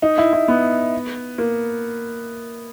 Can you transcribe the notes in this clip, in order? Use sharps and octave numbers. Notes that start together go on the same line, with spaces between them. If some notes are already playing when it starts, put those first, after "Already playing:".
D#4
E4
E4
B3
A#3